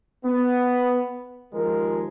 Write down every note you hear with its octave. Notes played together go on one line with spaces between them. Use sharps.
B3
D#2 F3 G#3 A#4